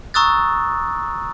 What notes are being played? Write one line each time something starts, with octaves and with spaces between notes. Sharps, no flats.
A#5 C#6 D#6 E6 F#6 A6